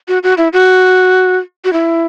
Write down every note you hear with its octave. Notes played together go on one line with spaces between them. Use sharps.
F#4
F#4
E4
F#4
F#4
E4